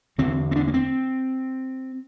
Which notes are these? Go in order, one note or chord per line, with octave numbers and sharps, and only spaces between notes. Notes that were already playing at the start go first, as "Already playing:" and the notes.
E2 D3 C4
C4
D4
A#3
C4